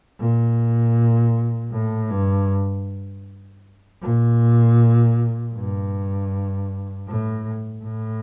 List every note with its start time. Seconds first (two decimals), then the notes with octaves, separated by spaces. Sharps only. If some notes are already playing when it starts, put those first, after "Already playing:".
0.19 A#2
1.72 A2
2.10 G2
4.01 A#2
5.54 G2
7.08 A2
7.84 A2